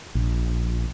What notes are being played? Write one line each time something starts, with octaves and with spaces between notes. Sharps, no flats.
A#1